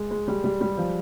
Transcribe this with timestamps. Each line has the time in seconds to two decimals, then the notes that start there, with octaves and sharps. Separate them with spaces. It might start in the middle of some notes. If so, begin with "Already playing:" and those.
Already playing: G#3
0.11 G#3
0.28 G3
0.44 G3
0.61 G3
0.78 F3